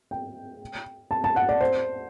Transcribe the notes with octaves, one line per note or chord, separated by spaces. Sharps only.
G5
A5
A5
F#5
D5
C5